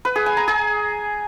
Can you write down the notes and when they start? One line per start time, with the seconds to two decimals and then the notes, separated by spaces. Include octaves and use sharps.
0.05 B4
0.16 G#4
0.26 G#5
0.37 A#5
0.48 G#4